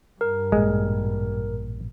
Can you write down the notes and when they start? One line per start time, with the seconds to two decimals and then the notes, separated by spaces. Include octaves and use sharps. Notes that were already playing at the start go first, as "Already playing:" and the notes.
0.21 G2 A#4
0.52 A1 A#2 G#3